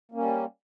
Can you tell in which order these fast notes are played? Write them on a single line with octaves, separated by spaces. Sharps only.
A#3 C#4 G3